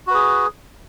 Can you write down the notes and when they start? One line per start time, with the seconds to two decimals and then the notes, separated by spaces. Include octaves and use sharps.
0.07 F#4
0.11 B4
0.14 G#4